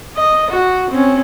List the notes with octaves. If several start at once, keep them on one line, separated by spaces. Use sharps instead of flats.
D#5
F#4
C4 C#4